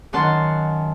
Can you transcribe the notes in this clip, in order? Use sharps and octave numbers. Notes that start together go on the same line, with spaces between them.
F#2 D#3 F#5 A5 C6